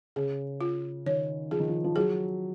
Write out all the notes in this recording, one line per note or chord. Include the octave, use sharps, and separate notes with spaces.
C#3 G#4
F4
D#3 C#5
F3 G#4
D#3
F3
F3
F#3 G#4